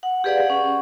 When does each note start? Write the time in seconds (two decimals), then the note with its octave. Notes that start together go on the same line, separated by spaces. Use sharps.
0.03 F#5
0.24 G4 G#4 B4 D5 F5 F#5
0.47 C#4 F#5